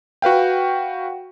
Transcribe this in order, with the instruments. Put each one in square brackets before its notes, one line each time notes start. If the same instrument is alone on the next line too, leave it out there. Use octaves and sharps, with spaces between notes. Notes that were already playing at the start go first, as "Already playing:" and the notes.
[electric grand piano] F#4 B4 F5 G5